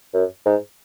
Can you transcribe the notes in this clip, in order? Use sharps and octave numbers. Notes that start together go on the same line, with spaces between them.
F#2
G#2